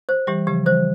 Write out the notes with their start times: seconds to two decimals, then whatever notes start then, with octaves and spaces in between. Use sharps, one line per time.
0.09 C5
0.27 E3 G3 G4
0.47 C#3 F3 G4
0.66 E3 G3 C5